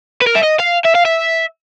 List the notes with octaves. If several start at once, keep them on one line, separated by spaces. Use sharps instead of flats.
B4
A#4
E5
D#5
F5
E5
F5
E5